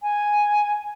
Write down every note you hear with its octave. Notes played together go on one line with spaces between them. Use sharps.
G#5